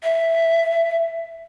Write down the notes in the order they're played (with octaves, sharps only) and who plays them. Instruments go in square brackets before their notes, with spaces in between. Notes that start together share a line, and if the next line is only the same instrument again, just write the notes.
[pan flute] E5